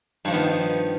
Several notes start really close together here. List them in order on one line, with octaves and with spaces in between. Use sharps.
G2 F3 D#3 B3